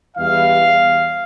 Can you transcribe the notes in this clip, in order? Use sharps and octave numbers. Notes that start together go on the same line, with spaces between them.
E2 E3 G3 F5